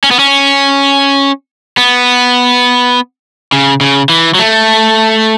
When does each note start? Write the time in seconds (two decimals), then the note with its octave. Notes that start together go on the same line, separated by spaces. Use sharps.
0.04 C#4
0.11 B3
0.19 C#4
1.77 B3
3.52 C#3
3.81 C#3
4.09 E3
4.35 F#3
4.39 A3